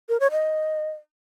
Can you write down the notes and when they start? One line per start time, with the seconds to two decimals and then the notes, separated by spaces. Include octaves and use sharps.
0.09 A#4
0.20 C#5
0.31 D#5